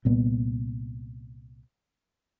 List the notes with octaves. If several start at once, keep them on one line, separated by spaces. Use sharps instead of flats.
C2 A#2 B3